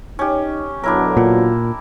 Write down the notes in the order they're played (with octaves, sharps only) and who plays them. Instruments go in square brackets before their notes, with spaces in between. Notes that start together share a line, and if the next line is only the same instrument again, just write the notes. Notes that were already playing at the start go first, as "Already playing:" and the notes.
[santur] C#4 G4 [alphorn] D#4
[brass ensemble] B2 D3 F#3 [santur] D4 E4 A#4 [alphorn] C#5
[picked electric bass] A#2 [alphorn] F4